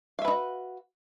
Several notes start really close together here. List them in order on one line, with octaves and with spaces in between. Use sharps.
F5 E5 B4 D#4 F#4